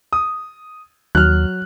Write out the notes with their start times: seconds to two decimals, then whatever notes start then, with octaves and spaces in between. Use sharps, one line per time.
0.13 D#6
1.15 D#2 F#3 F6 F#6